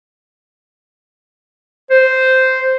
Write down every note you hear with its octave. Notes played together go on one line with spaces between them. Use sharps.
C5